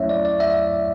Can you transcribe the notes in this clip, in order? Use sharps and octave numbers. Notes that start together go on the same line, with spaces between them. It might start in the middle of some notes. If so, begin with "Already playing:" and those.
Already playing: F#3 A3 C#4 E4 C#5 E5
D5
D5
E5